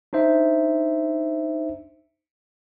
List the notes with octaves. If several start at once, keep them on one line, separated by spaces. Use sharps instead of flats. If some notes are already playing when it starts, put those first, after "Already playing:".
D4 D#4 C5 E5